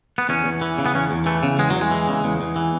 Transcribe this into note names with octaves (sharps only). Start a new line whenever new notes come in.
B3
E2 C#4
E2
E3
C#3
B3
E2 C#4
E2
E3 A3
C#3
E2 G#3
F#3
E2
G#3
E3
C#3
E2
E2
E3